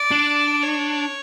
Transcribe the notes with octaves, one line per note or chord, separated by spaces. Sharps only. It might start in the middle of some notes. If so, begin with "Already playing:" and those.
Already playing: D5
D4
C#5